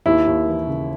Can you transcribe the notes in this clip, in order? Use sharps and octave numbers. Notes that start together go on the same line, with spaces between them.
D#2 E4
D#2
E3
C#3